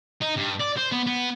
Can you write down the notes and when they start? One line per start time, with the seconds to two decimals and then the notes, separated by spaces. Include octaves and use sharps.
0.21 D#4
0.36 G2
0.60 D5
0.77 C5
0.92 B3
1.07 B3